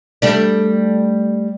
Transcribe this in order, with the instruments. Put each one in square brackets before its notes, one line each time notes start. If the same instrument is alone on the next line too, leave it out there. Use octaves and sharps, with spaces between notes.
[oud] G3 A3 D4